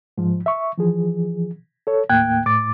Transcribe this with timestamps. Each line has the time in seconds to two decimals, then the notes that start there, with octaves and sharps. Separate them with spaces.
0.18 G#2 F3
0.46 E5 C#6
0.78 E3 F3 G#4
1.87 A4 C#5
2.09 D#2 A2 A#3 G5 F#6 G#6
2.46 A2 D6 A6